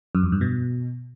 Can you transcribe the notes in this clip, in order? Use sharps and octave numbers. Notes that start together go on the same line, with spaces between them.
F#2
F2
G2
B2